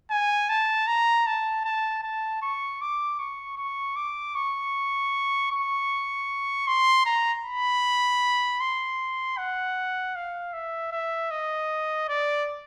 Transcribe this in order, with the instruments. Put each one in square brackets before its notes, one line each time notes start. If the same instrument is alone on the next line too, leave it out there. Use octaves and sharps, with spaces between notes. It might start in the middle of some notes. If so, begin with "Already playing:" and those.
[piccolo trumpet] G#5
A5
A#5
A5
A5
A5
C#6
D6
C#6
C#6
D6
C#6
C#6
C6
A#5
B5
C6
F#5
F5
E5
E5
D#5
D5